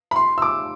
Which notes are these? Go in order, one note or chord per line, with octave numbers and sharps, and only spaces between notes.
B5
C6
E6
D6